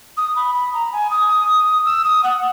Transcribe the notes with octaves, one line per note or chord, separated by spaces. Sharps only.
D#6
B5
B5
A#5
G#5
D#6
E6
D#6
F#5